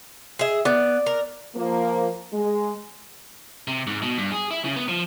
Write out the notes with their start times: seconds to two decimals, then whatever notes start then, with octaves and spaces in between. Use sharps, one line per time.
0.39 G#4 E5
0.65 B3 D5
1.06 A#4
1.55 F3 A#3
2.32 G#3
3.68 C3
3.87 G#2
4.02 B2
4.18 G2
4.32 G#4
4.51 E4
4.64 C#3
4.76 B3
4.89 F3